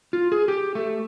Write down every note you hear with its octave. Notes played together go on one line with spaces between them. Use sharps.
F4
G#4
G4
A3